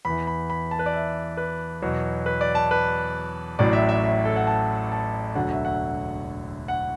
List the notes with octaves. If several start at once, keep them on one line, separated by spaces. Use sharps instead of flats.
E2 E3 B5
B5
B5
A5
B4
D5
E5
B4
E2 B2 F#3
B4
D5
A5
B4
A1 A2 F#3 D5
E5
E5
E5
A4
F#5
A5
A5
E1 D2 D3 F#3 F#5
E5
F#5
F#5